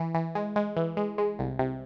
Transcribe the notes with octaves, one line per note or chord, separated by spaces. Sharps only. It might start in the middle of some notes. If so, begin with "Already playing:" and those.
Already playing: E3
E3
G#3
G#3
E3
G#3
G#3
C2
C3